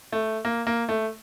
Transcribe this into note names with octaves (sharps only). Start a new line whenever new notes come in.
A3
A#3
A#3
A3